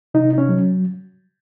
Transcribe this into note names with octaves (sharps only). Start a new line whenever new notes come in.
C3 D#4
D#4
C#4
F#3